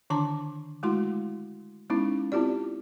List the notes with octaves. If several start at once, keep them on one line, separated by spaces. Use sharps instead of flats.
D3 D#3 D4 A5 A#5 D6
G#3 A3 E4 F#4 C6
G#3 B3 C#4 D#4 E4
C4 E4 F4 G4 D5